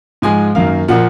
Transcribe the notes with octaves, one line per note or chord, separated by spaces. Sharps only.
G#2 F3 G#3 G#5
F#2 D#3 A#3 F5
A#2 F3 A#3 F#5